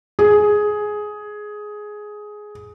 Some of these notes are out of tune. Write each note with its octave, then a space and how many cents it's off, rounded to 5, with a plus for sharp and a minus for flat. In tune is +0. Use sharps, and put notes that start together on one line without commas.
G#4 +10